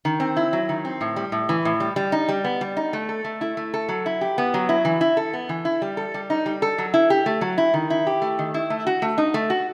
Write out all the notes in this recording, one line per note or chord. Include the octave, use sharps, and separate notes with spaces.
D#3
C4
E4
F#3
D#3
C4
A2
G3
A2
E3
A2
G3
G3
D#4
G3
B3
G3
D#4
A3
A4
A3
E4
A3
A4
F#3
E4
G4
B3
F#3
E4
E3
E4
A4
B3
E3
E4
G3
A4
G3
D#4
G3
A4
F#3
E4
G4
A3
F#3
E4
D#3
E4
G4
A3
D#3
E4
A3
F#4
A3
D#4
A3
F#4